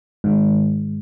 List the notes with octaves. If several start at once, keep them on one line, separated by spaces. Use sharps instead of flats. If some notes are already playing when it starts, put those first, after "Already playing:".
G#2 D#3